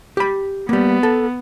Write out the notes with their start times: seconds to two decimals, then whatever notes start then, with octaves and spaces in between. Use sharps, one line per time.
0.17 G4 B5
0.69 G3 A#3 B3
1.03 A4